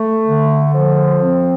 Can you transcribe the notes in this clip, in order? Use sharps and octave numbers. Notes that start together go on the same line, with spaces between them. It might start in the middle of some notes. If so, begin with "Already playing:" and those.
Already playing: A3
D3
F3
C4